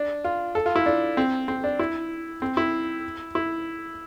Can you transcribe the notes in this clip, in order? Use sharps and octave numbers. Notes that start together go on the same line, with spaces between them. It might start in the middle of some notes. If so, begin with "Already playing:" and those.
Already playing: D4
F4
A4
F4
E4
D4
C4
C4
D4
E4
C4
E4
E4